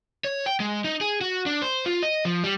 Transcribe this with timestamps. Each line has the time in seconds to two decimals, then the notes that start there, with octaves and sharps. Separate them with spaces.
0.24 C#5
0.46 G5
0.60 G#3
0.84 D#4
1.01 G#4
1.21 F#4
1.46 D4
1.62 C5
1.86 F4
2.02 D#5
2.25 F3
2.44 G3